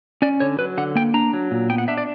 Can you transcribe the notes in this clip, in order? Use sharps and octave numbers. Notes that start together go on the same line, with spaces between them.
C#4 D5
D3 C#5
F#3 B4
D3 F#5
A#3 G5
D4 A#5
F#3
A#2
B3 G5
F#5
D4 E5
D5